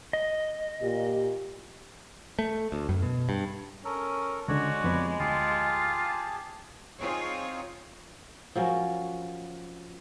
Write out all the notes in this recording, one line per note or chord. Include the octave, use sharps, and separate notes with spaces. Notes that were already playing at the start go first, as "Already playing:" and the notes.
D#5
A#2 G4
A3
D2
F#2
B2
G2
C#4 A4 A#4
C#2 D3 G#3 F#4 C#5 D5
F2 B3 B5
D2 F4 G4 G#4 A5
C4 D#4 F4 G#4 C#5
F3 F#3 C#4 A#4